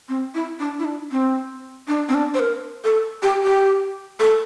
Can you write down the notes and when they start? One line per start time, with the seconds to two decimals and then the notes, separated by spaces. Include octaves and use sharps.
0.09 C4
0.34 E4
0.59 D4
0.79 E4
0.85 D4
1.11 C4
1.88 D4
2.09 C4
2.14 D4
2.34 C5
2.39 A#4
2.84 A4
3.22 G4
3.43 G4
4.20 A4